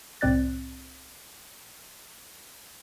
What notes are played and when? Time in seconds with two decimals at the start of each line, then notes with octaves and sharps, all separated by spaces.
0.21 C2 A2 C4 D5 F#6 A6